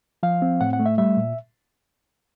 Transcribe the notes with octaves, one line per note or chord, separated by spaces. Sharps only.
F3 F5
C4
A2 F#5
F#5
A3
E5
G3 E5
A#2